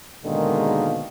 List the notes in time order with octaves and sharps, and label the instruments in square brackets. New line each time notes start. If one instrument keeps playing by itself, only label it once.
[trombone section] G#2 B2 D3 D#3 G#3 A#3